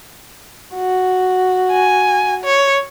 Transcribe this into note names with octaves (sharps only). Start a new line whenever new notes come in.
F#4
G#5
C#5